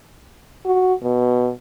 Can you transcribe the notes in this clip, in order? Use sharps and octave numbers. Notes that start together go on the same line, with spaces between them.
F#4
B2